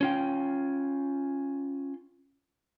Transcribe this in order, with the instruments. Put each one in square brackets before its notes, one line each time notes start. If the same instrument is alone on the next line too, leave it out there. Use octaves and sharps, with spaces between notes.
[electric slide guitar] C#4 F4 G5